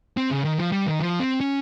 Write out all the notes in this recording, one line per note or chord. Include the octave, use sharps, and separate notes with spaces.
C4
C#3
D#3
F3
G3
D#3
F3
C4
C#4